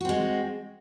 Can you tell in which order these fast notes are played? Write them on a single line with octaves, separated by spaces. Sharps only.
F#4 C4 G#3